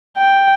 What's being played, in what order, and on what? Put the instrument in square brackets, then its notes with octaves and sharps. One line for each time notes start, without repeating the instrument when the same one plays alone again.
[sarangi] G5